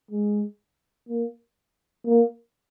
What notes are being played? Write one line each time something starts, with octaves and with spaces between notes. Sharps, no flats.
G#3
A#3
A#3